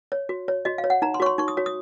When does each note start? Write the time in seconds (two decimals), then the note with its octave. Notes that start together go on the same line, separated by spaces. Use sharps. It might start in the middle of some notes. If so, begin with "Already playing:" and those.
0.12 C#5
0.29 F#4
0.48 C#5
0.65 F#4 D#5
0.78 F5
0.84 C#5
0.90 F#5
1.02 D#4 A#5
1.14 C6
1.20 F#4 C#5 C#6
1.26 C6
1.38 D#4 C#6
1.48 D#6
1.57 F#4 C#5
1.66 D#6